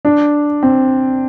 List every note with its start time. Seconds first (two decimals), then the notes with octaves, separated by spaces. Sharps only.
0.05 D4
0.63 C4